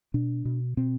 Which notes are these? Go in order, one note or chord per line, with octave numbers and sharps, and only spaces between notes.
B2 D4
B2
B2 C4